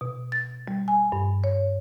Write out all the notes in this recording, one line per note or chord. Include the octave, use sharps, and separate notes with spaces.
B2
A6
G3
G#5
G2
C#5